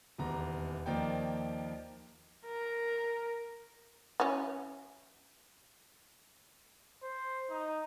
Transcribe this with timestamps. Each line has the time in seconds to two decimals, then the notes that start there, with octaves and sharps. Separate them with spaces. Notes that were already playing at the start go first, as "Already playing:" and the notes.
0.18 D#1 E2 A#5
0.86 D#2 F3 A#3 D#4 D5 G5
2.46 A#4
4.20 E3 F#3 C#4
7.02 C5
7.50 D#4